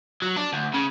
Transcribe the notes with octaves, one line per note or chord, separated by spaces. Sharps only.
F#3
D4
D2
C#3